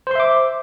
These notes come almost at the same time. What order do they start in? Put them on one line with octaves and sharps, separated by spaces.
C5 C6 E5 D6